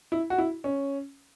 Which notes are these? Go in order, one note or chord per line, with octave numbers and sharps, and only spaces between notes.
E4
F#4
E4
C#4